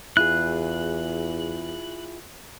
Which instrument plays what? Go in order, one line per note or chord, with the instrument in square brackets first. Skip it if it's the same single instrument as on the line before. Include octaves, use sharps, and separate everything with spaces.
[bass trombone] E2 [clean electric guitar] E4 F4 G#4 [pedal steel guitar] F#6